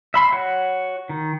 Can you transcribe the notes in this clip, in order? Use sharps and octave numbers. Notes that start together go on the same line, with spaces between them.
E5 B5 C6
F#4 C#5 F#5
D#3